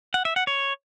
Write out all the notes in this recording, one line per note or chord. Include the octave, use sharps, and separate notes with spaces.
F#5
E5
F#5
C#5